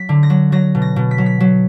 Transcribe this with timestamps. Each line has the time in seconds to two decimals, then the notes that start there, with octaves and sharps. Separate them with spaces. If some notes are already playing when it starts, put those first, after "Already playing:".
Already playing: F#3 B6
0.09 D3
0.23 A#6
0.30 F#3
0.52 F#3 A#6
0.75 B2
0.82 A#6
0.96 B2
1.11 B6
1.18 F#3
1.26 B6
1.40 F#3